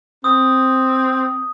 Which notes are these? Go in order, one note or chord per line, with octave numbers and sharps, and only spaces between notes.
C4 D#6